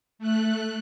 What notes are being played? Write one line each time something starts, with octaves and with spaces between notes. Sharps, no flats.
A3 F#6